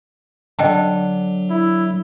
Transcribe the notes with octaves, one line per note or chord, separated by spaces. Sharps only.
D3 F#3 D#5 G5 A5
E4